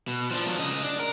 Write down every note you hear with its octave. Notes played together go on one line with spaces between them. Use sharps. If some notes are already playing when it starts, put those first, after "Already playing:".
B2
F3 D4
F3 F#3
C#3 D#5
D4
A#4